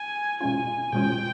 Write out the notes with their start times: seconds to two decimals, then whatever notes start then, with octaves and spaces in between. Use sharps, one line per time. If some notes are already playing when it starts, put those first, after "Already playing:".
Already playing: G#5
0.41 B2 G#3 C#4 F4 G#5
0.93 B2 G#3 C#4 F4 G5